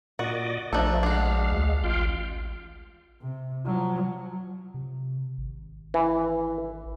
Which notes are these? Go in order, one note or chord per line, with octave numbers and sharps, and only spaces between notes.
A#2 F#4 D5 D#5
A#1 F3 A3 D4 D#4 A4
G#3 D4 F#4 F5
D2
A1 F4 F5 G5
C3
F3 F#3
C3
G#1
E3